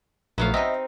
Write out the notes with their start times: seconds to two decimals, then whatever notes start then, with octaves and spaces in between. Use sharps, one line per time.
0.38 A#1 F#3 A3 B3 F5
0.54 C4 D#4 D#5 E5